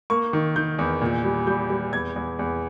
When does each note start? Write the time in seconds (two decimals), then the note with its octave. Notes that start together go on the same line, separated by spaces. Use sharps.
0.10 A#3 C#6
0.33 D#3
0.56 D#3 G6
0.78 E2
1.02 A#2
1.24 G3
1.47 G3 G6
1.70 G3
1.92 E2 G#6
2.16 E2
2.39 E2